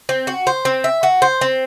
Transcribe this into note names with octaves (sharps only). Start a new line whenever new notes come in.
C4
F#4
C5
C4
E5
F#4
C5
C4